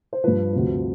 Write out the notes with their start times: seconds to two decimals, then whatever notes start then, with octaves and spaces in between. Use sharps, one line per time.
0.13 C5
0.24 G2 F3 B4
0.53 D2 C3 F3